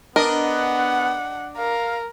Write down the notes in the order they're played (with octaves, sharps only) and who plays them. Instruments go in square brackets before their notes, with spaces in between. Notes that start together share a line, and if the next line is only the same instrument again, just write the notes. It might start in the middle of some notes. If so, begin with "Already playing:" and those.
[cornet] B3 [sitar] D4 D#5 [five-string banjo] A#4
[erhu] F#5
[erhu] A#4 [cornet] F5